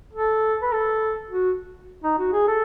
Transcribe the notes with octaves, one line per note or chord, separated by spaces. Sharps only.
A4
B4
A4
F#4
D#4
F#4
G#4
A4